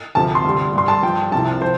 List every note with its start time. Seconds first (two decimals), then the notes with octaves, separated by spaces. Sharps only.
0.15 D2 C3 F3 A5
0.35 C6
0.44 G2 D3 G3
0.73 G2 G3 C6
0.88 A5
1.03 G2 F3 G5
1.32 C2 C3 F3 A5
1.61 F3 C5